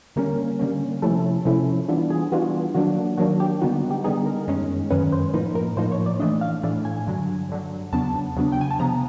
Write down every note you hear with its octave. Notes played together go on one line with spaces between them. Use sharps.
D3 G3 A#3 C#4 A#4
D3 G3 A#3 C#4
C3 F3 A3 C#4 E4 A4
C3 F3 A3 C#4 E4
E3 G3 B3 D4 F4
G#4
E3 G3 B3 D4 F4 F#4
D#3 F#3 A#3 D4 F#4
D#3 F#3 A#3 D4 F#4
G4
D3 G3 B3 D#4 F#4
G4
D3 G3 B3 D#4 G#4
A#4
F#2 D#3 G#3 C#4
F#2 D#3 G#3 C#4 B4
C5
A2 F3 A#3 D#4 B4
A#4
A2 F3 A#3 D#4 C5
C#5
D5
A2 E3 A3 D4 D#5
F5
A2 E3 A3 D4
G#5
G2 D3 F#3
G2 D3 F#3
E2 C#3 F#3 B3 D4 A5
E2 C#3 F#3 B3 D4
G5
G#5
A5
C3 F3 G#3 B3 A#5